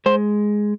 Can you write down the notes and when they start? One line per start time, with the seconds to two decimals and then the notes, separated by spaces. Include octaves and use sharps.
0.06 G#3 C5